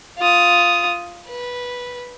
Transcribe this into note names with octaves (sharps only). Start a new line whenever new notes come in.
F4 D#6
B4